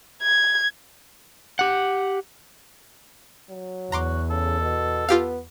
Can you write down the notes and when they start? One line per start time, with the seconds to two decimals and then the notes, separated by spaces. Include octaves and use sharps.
0.23 G#6
1.59 G4 F#5
3.49 F#3
3.92 E2 F#4 A#5 C6 D6
4.30 C#3 A4
4.61 B2
5.09 B3 F4 G4 F5